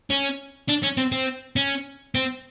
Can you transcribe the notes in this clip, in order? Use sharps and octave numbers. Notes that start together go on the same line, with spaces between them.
C#4
D4
C#4
C4
C4
C#4
C4